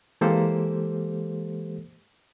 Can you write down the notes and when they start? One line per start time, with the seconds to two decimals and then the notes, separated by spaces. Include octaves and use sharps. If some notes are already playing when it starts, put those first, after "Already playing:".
0.21 E3 G#3 A#3 G4 A4 C5